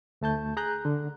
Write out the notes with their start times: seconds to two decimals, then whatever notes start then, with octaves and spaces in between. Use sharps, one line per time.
0.21 D2 A3 A5 G6
0.57 G#4 A#5 F#6 G6
0.85 D3